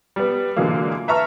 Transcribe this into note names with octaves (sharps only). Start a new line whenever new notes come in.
G3 B3
A#2 D3 E3 F#3 G#3 A#3
B4 E5 A5 A#5 C#6 F6